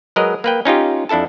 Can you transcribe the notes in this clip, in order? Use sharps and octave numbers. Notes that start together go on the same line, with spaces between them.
F#3 G#3 A#4 B4 D#5
A#3 B4 G5
C#4 D#4 F4 G4
F2 D4 E4 A4 A5